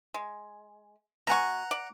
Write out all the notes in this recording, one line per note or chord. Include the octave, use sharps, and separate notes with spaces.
G#3
B2 F#5 G#5 A#5 C#6
D5